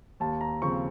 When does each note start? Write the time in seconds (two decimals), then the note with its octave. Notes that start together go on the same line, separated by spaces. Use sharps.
0.20 D#2 A5
0.41 A#5
0.62 C#3 F3 C4 C#6